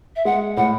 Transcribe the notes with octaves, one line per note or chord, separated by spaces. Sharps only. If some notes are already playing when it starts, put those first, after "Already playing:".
E5
G#3 F#5
A2 F#5